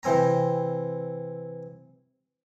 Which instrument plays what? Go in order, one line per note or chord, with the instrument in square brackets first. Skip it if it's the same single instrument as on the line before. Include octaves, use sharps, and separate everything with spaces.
[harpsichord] C3 E3 C4 G#5 A#5